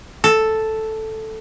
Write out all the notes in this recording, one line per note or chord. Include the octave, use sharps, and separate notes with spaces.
A4